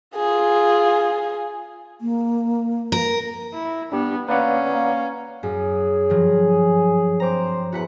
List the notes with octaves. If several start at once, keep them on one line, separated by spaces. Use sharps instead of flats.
F4 G#4
A#3
A#4
E4
B3 D4 G4
A#3 C#4 B4 D5 F#5
A#3
F#2 G#4
G2 F3 F#3
C4 C5 A#5 D6
E2 F#4 B4 F#5